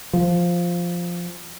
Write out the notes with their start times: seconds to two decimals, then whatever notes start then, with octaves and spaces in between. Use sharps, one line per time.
0.13 F3